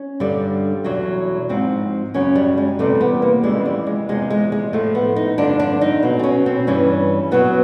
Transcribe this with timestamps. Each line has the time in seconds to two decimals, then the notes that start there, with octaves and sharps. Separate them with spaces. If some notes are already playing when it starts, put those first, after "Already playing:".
Already playing: C#4
0.20 G2 D3 G3
0.84 E2 B2 F#3
1.49 G#2 F3 C4
2.14 F#2 C#3 F#3 C#4
2.36 G3
2.58 G#3
2.79 E2 C3 E3 G3 A3
3.01 B3
3.22 A#3
3.44 F2 C#3 E3 G3 G#3
3.66 G3
3.87 G#3
4.09 E2 C3 F3 G#3
4.30 G#3
4.52 G#3
4.73 A2 F3 A3
4.95 B3
5.16 D#4
5.38 G2 D3 F3 D4
5.60 D4
5.81 D#4
6.03 B2 F#3
6.19 C4
6.23 C#4
6.46 C4
6.67 G2 E3 G3 C#4
7.31 B2 F#3 B3